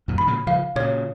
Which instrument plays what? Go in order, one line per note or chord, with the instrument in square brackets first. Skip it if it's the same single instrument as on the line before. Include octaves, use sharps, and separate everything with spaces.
[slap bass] F#2 A#2
[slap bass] D#3 [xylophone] B5
[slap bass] A#2 C#3
[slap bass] C#3 F3 [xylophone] F5
[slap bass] A#2 C#3 [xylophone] C#5